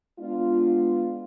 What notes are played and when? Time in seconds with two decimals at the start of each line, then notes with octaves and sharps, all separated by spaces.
0.19 G#3 B3 D4 F4